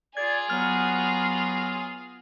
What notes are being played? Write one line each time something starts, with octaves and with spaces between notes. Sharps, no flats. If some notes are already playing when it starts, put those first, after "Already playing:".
F4 G#4 D5 G#6
F#3 B3 F#4 F6